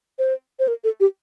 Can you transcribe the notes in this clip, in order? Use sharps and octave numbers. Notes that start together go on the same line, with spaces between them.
C5
C5
A#4
A4
G4